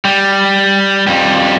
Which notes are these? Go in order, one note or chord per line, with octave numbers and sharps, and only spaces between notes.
G3
F2 G3